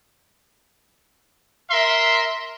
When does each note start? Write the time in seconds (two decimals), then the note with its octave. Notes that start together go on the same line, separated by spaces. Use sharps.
1.70 A#4 E5 C6